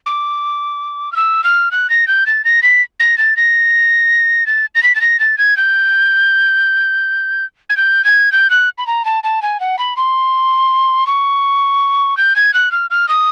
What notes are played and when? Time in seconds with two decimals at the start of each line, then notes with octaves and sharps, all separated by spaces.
0.06 D6
1.12 F6
1.16 E6
1.44 F6
1.71 F#6
1.90 A#6
2.07 G6
2.26 A6
2.45 A#6
2.62 B6
3.00 A#6
3.18 A6
3.37 A#6
4.46 A6
4.75 A#6
4.83 B6
4.95 A6
5.01 A#6
5.19 A6
5.38 G#6
5.57 G6
7.69 G#6
7.77 G6
8.04 G#6
8.32 G6
8.50 F#6
8.78 B5
8.87 A#5
9.05 A5
9.24 A5
9.42 G#5
9.60 F#5
9.79 B5
9.97 C6
11.07 C#6
12.17 G6
12.36 G#6
12.53 F#6
12.72 F6
12.90 F6
13.08 D#6